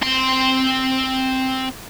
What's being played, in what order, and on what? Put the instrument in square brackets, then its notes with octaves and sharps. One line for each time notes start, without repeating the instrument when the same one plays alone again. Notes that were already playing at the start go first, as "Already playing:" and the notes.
[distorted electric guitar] C4 C6